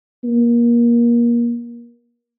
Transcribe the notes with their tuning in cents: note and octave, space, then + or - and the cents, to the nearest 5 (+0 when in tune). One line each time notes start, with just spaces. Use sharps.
A#3 +25